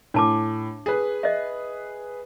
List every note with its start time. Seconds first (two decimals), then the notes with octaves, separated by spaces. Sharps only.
0.14 A2 D4 A5 D6
0.86 G#4 B4
1.23 D#5 E5